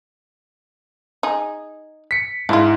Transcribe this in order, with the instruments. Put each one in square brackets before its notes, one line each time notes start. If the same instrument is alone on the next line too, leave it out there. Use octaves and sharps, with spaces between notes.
[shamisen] D#4 G#4
[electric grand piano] B6 C#7
[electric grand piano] G#2 E4 [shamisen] D4 F4